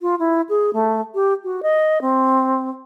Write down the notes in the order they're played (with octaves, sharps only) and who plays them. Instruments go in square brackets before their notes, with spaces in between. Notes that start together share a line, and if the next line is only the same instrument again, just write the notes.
[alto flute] F4
E4
G#4
A3
G4
F#4
D#5
C4